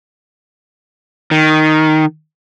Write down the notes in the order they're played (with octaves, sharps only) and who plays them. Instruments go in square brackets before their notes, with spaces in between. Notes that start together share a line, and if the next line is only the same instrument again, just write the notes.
[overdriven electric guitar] D#3